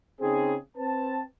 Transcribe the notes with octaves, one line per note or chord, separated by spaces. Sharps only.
C#3 C4 D#4 G#4
C4 B4 A5